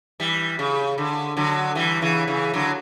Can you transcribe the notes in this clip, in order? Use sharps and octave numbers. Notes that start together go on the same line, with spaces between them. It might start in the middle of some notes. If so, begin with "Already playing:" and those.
E3 G3
C#3
D3
D3 F#3
E3 G3
C#3 E3
C#3 E3
D3 F#3